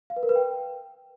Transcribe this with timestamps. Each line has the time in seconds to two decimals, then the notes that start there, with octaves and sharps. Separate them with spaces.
0.10 F5
0.16 B4
0.23 A#4
0.29 B4
0.36 G5